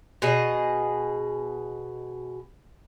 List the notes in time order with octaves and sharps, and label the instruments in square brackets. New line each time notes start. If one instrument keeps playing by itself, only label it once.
[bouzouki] B2 G#4 D#5